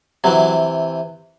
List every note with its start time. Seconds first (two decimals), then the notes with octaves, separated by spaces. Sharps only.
0.24 C3 E3 F#3